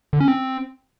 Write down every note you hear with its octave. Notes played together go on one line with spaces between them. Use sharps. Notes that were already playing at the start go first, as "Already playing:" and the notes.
D3
C#4
C4